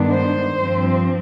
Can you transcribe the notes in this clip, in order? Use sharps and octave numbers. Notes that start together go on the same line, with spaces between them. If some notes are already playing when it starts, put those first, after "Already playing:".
Already playing: G2 D#3 G#3 B3 D4
C5
G2 F3 C4